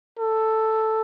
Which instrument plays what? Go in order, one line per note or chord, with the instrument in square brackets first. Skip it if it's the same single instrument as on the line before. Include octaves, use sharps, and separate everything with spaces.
[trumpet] A4